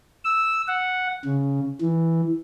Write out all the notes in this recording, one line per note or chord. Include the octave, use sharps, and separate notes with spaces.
E6
F#5
C#3
E3